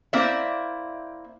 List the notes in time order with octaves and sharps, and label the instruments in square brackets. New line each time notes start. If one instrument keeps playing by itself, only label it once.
[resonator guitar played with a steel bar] A#3 C4 E4 D5 E5